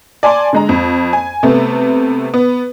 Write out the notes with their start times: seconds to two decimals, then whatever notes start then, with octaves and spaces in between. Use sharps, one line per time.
0.23 D5 G#5 A5 C6
0.53 D3 G#3 A#5
0.69 F2
1.13 G#5
1.43 C3 A3 B3
2.34 B3